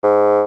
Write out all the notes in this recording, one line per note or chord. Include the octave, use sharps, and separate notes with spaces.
G#2